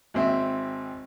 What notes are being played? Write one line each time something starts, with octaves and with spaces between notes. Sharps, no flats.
G#1 C4 E5